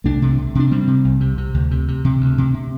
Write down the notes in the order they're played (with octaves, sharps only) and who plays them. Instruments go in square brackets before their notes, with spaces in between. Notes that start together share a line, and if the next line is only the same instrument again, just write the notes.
[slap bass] C2 A3 D4
C3
C3
C3 D4
C3 G3 C4
C3
C2
C3
C3
D2
C3
C3
C3
D2
C3
C3